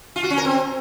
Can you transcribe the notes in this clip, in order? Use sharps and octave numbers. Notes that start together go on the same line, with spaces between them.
F4
F#4
C#4
A#4
C4